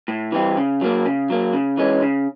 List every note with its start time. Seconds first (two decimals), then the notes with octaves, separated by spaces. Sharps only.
0.08 A2
0.32 E3 G3 C4
0.57 C#3
0.81 F#3 A#3
1.06 C#3
1.30 F#3 A#3
1.53 C#3
1.77 E3 G#3 C#4
2.02 C#3